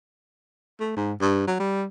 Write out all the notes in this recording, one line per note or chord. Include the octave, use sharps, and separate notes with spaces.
A3
G#2
G2
F#3
G3